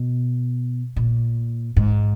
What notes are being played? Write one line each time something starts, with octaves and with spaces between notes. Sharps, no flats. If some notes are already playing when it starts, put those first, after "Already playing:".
Already playing: B2
A#2
G#2